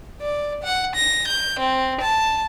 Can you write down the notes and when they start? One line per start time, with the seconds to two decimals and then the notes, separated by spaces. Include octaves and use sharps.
0.21 D5
0.63 F#5
0.95 A#6
1.28 G6
1.60 C4
2.01 A5